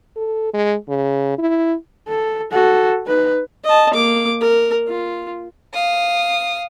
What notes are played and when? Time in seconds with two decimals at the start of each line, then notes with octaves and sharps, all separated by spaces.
0.16 A4
0.53 G#3
0.89 C#3
1.38 E4
2.08 A4
2.52 F#4 A4
3.07 D#4 B4
3.65 D#5 A5
3.94 A#3 D6
4.41 A#4
4.88 F4
5.74 F5 D#6